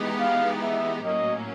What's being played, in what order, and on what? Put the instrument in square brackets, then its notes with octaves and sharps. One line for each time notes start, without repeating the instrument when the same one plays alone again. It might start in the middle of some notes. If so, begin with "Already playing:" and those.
Already playing: [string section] E3 G#3 B3 D#4 G4
[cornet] F5
E5
[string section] A2 F#3 A#3 C#4 [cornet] D#5